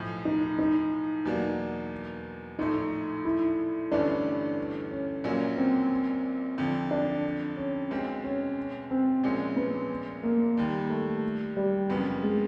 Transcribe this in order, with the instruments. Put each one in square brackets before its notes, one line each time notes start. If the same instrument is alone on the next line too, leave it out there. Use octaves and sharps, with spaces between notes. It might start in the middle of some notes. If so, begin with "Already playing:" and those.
Already playing: [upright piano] B1 A2 F3
[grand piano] D#4
D#4
[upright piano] E2 B2 F#3 A#3 D4
[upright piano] A#1 A2 F3 A3 [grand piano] D#4
[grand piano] E4
[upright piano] G1 G2 E3 A3 C#4 [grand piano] D4
[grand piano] C#4
[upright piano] A#1 A#2 F#3 A#3 C#4
[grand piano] C4
[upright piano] F2 D3 F3
[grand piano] D4
C#4
[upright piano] B1 B2 G#3 C4
[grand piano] C#4
C4
[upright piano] A#1 A#2 F3 G#3 C#4
[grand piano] B3
A#3
[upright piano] D#2 D#3 G3
[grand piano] A3
G3
[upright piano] F#1 F2 C#3 F#3 B3
[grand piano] G#3